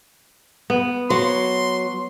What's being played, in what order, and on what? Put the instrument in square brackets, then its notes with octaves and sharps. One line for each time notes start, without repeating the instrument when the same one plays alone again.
[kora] B3
[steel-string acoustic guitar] F#3 [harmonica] C6